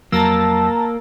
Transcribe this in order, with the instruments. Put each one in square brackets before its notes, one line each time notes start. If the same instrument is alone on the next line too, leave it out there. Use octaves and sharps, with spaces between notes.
[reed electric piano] F2 F#3 [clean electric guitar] A#3 [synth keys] A5 A#5 E6